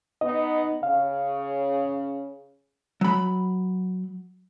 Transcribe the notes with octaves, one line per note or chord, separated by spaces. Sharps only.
B3 D#4 D#5
C#3 F5
F#3 B5